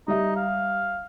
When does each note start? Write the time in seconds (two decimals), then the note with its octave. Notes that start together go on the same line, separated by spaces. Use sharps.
0.08 G3 D#4 E5
0.36 F5